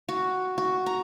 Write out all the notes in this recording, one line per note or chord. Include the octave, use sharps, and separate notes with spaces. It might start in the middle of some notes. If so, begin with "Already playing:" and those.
F#4
F#4
A#5